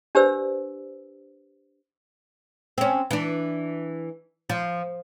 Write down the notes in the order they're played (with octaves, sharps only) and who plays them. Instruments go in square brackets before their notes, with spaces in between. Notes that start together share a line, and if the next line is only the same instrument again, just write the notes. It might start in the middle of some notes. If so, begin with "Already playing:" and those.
[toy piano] D4 G4 B4 C5 D5 E6
[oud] C4 C#4
E3 D4
F3